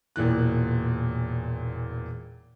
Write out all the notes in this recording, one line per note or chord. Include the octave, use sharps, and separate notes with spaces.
E1 A#2 E3 F#6